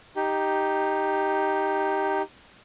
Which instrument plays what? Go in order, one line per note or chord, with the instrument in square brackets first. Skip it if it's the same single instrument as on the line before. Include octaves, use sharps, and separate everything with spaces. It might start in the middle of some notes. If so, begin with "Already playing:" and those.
[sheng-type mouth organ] D#4 G4